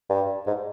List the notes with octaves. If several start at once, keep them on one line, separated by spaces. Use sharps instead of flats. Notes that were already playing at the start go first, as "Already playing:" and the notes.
G2
G#2